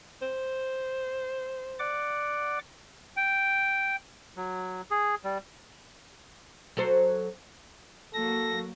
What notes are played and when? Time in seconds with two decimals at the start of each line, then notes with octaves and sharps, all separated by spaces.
0.22 C5
1.79 D5 F#5 D6
3.17 G5
4.37 F#3
4.91 G#4
5.24 G3
6.77 F#3 A4 C5
8.14 F#3 A#3 F#4 A4 A#6